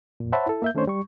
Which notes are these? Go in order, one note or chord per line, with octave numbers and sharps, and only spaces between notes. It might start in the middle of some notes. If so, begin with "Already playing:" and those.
F2 A#2
C5 C#5 E5 F#5 A5 B5
E4 A4
A#3 E5 G6
D#3 A3 C#4 D4 C5 C#5
G3 C#6